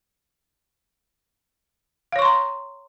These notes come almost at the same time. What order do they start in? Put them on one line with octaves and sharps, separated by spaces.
F5 C#5 C#6 C6 A#5